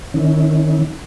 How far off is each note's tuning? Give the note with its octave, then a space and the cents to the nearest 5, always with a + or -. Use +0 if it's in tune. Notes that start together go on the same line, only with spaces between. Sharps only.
D#3 -10 C#4 +5 E4 -35